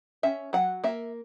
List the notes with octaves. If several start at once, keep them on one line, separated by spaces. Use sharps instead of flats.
C#4 E5
F#3 F#5
A#3 E5